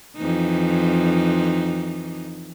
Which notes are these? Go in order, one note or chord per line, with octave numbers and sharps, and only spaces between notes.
F2 E3 D#4